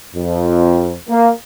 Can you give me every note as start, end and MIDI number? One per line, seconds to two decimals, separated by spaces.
0.15 0.93 41
1.09 1.30 58